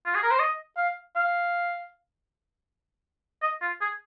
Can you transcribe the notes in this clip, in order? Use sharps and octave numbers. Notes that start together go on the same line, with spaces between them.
F4
G#4
A#4
C5
D#5
F5
F5
D#5
F4
G#4